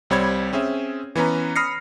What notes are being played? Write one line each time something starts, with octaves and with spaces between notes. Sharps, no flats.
C2 G3 C4 C#5 B5 G#6
C4 C#4 G#4 E5
E3 B3 C#4 B4 A#5
B5 D#6 F6 A#6 C7 C#7